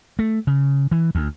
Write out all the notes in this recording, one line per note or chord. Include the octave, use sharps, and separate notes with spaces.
A3
C#3
E3
D2